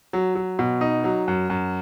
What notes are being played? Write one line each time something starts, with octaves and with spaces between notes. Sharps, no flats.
F#3
F#3
B2
D#4
F#3
F#2
F#2